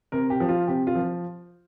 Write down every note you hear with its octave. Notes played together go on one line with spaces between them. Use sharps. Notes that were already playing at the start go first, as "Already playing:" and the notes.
C3 A#4
G4
F3
F4
C3 G4
F4
F3